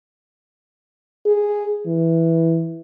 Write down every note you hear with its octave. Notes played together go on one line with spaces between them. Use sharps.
G#4
E3